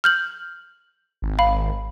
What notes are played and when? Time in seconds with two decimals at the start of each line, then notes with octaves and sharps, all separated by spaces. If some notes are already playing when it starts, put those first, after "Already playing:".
0.04 F6 G6 F#7
1.22 G#1
1.39 F5 B5